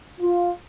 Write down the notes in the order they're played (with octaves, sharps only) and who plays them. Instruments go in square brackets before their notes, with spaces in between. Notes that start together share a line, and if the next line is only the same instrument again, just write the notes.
[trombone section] F4